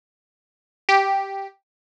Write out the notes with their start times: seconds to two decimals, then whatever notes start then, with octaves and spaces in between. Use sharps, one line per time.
0.89 G4